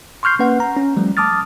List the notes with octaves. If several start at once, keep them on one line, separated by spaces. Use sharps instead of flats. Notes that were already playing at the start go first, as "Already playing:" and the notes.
C6 C#6 F6 G6 C7
A#3 C#4 B4 F#5
A#5
C#4
F3 G3 A3
A5 D6 D#6 F6 A6